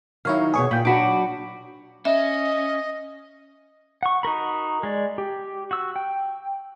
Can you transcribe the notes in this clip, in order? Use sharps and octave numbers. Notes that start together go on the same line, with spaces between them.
D#3 F#3 D#4 E4 C#5 F5
E2 B2 G#4 C#5 C#6
A#2 G5 B5
F#3 D4 F#4 B5 D6
C#4 D#5 E5
F#5 C#6
D#4 F#4 A#4 B5
G#3 D5
G4
F#4 E6
G5